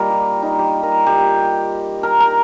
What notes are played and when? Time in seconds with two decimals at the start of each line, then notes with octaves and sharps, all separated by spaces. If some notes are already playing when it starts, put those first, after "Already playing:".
Already playing: G3 A#3 D#4 F4 A#4
0.10 G4
0.42 D#4
0.59 G4
0.83 A#4
1.06 G4
2.03 A#4
2.20 A#4